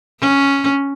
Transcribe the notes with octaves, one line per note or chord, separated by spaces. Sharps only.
C#4